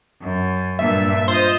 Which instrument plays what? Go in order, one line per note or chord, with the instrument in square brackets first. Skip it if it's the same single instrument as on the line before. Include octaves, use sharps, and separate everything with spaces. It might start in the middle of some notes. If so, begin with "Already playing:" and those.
[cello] F#2
[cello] G2 A#2 [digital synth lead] E5
[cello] F4 D#5 [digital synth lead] C5